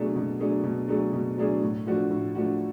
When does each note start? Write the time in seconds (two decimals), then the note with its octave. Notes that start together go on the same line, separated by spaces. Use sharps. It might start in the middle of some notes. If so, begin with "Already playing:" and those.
Already playing: B2 F#3 A3 D4 G#4
0.16 B2
0.40 F#3 A3 D4 G#4
0.64 B2
0.88 F#3 A3 D4 G#4
1.13 B2
1.38 F#3 A3 D4 G#4
1.62 A2
1.87 F3 A3 D4 F#4
2.11 A2
2.35 F3 A3 D4 F#4